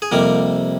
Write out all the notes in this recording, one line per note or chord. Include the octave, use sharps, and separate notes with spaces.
G#4
F2 C3 G3 A#3 A#4